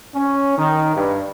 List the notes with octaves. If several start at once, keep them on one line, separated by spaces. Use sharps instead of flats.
C#4
D#3
G2